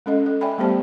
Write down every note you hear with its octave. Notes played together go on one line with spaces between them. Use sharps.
G#3 C#4 A4 D#5
A4
D5 E5 G5 G#5 B5
G3 A3 B3 G4 C5 A5